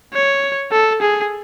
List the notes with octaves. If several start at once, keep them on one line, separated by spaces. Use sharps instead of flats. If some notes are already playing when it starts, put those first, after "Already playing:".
C#5
A4
G#4